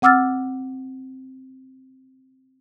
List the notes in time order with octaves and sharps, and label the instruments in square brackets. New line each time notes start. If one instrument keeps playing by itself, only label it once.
[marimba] C4 F#5 D6 E6 F6 A6